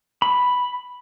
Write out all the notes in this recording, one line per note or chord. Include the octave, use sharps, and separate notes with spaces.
B5